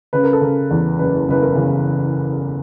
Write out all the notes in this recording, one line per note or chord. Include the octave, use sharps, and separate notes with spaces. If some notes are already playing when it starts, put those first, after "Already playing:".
C#3 B4
A#4
A4
C#3 A#4
E2
F#1 B4
F#1 B4
A#4
C#3